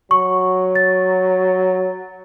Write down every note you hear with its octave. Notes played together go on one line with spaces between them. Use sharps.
F#3 C#6
A6